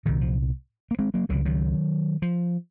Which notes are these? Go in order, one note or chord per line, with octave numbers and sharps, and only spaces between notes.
C2 A#2 D#3
F3
A#3
G#3 C4
F#3 A#3
C#2 C3 D#3 F#3
D#3 F#3
F3